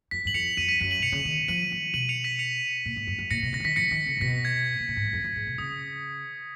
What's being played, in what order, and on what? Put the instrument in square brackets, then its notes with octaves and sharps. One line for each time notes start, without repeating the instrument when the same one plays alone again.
[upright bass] F2 [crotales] B6
[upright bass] F#2 [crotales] F#7
[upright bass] F2 [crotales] C#7 F7
[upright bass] F2 [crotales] B6 D#7
[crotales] B6 D#7
[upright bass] F#2 [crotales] B6
[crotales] D#7 F#7
[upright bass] B2 [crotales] C#7 F7
[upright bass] C#3
D#3
[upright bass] F3 [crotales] D#7 F#7
[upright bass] D#3
[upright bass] B2 [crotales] D#7 F#7
[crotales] C#7 F7
B6 D#7
C#7 F7
[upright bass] A#2
G#2
F#2
F#2
[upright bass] A#2 [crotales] A#6 C#7
[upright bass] B2
[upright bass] C#3 [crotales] A#6
[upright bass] F3
[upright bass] D#3 [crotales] B6
[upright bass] F3 [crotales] A#6 C#7
[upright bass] D#3
C#3
A#2
[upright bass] B2 [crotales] B6
[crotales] G#6
[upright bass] B2
A#2
G#2
F#2
F2
F#2
G#2
B2
[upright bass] C#3 [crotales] D#6